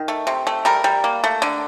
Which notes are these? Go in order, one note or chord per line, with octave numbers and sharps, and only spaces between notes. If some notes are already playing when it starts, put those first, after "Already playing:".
Already playing: D#3
A3
C3
A3
G3 A#4
G3
A#3
A3
D3